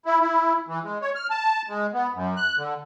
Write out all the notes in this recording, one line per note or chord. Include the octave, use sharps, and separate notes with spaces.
E4
E4
E3
G#3
C#5
F6
A5
G#3
B3
F#2
F#6
D3